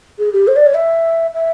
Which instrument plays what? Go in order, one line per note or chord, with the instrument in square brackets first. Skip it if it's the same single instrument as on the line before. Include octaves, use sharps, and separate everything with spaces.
[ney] G#4
G4
C5
D5
C#5
E5
E5